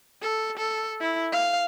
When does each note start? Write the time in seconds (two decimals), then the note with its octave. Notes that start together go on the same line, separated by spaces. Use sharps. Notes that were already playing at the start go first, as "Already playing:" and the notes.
0.22 A4
0.57 A4
1.01 E4
1.32 F5